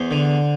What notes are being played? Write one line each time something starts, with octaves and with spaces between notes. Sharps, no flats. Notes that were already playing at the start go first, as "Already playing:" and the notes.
Already playing: E2 C5
D3